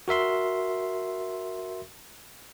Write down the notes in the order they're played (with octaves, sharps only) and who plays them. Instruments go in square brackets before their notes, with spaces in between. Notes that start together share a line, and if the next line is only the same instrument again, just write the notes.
[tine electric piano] F#4 A#4 E5 C6